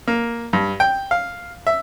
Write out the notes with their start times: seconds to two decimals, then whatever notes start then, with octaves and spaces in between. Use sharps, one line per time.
0.08 A#3
0.53 G2
0.80 G5
1.11 F5
1.67 E5